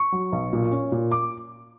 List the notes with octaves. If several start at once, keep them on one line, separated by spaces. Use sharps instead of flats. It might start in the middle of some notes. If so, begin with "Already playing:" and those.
Already playing: C#6
F#3
B1
A#2
C#4
A#2
D6